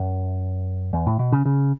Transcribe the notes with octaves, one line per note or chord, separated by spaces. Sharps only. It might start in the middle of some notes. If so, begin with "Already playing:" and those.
Already playing: F#2
E2
A2
B2
C#3
C#3